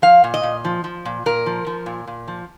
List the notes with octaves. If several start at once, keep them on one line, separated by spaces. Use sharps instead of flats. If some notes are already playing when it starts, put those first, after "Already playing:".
F3 F5
A#2
D#5
A#2
F3
F3
A#2
A#2 A#4
F3
F3
A#2
A#2
F3